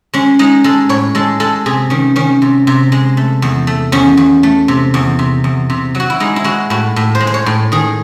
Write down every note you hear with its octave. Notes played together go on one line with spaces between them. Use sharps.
G#3 C#4
G#3 D#4
G#3 A4
A2 C#5
G#3 A4
G#3 A4
C3 G#4
D#3 C#4
D#3 C#4
C3
C3
G#3
A3
E2
A3
E2 C#4
E2
A3
C3
E2
C3
E2
C3
F#3
F#4
E4
G#3 D#4
E4
G#3 F#4
A2 F#4
A2
C5
G#3
C5
C#5
A2
D#3 G#4